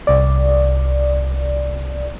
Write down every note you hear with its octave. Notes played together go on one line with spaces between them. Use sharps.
C2 D5